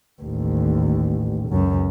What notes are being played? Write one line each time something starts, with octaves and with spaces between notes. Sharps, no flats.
A1 D#2
C#2 F#2